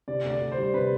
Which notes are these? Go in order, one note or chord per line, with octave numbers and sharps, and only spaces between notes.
C3 D5
D2 D5
D2
C5
G3
C3 B4